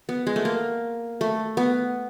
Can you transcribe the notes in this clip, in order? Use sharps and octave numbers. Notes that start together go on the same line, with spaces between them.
B3
G#3
A3
A#3
A3
B3